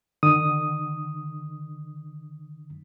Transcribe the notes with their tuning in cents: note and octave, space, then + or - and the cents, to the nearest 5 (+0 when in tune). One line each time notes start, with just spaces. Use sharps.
D3 +45 D#6 +0